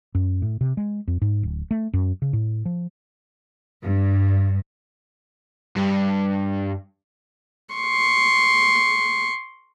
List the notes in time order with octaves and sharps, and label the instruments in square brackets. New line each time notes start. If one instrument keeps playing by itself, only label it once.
[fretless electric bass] F#2
A2
C3
G#3
F2
G#2
D1
A3
F#2
C#3
A2
F3
[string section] G2
[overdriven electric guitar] G2
[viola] C6 C#6